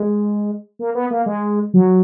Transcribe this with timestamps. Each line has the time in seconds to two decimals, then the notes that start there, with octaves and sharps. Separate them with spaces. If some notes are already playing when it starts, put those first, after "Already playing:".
Already playing: G#3
0.79 A#3
0.95 B3
1.11 A#3
1.26 G#3
1.74 F#3